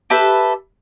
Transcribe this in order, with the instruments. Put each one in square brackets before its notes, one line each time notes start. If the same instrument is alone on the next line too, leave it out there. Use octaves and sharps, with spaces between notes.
[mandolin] G4 A4 B4 E5